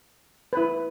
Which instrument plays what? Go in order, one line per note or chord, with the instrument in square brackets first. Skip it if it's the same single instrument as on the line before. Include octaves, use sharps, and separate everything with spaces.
[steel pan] E4 B4